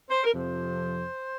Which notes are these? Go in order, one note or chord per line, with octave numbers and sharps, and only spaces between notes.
C5
A#4
F2 C3 F3 C5